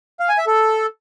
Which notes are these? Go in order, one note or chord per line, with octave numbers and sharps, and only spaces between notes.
F5
G#5
E5
A4